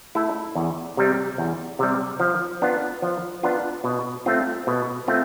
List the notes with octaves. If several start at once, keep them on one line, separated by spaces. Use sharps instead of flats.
A3 E4 A4
E2
C3 G3
E2
C3 G3
F3
B3 D4 F4
F3
B3 D4 F4
B2
A3 C4 F4
B2
A3 C4 F4